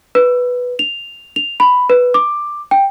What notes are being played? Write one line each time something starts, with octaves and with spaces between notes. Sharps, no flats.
B4
F7
F7
B5
B4
D6
G5